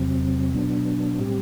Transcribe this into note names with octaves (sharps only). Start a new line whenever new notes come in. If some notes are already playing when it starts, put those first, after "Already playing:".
Already playing: E2 C3 F#3 C4
B2 F#3 B3 D4
A2 G3 C4 G4